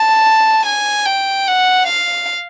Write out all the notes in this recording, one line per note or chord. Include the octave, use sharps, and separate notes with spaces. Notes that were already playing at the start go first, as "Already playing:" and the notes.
Already playing: A5
G#5
G5
F#5
F5